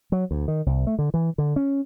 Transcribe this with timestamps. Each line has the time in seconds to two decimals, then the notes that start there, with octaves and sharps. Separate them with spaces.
0.12 F#3
0.31 D2
0.48 D#3
0.66 C2
0.87 A3
0.99 D3
1.14 E3
1.38 D3
1.56 C#4